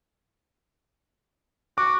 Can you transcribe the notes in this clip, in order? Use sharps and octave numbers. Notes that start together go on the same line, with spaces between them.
F#4 D6